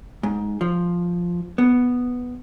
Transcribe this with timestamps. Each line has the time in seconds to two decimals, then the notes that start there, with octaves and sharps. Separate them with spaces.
0.23 G#2
0.61 F3
1.58 B3